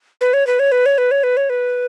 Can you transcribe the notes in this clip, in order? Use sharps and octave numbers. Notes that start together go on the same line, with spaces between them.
B4
C#5
B4
C#5
B4
C#5
B4
C#5
B4
C#5
B4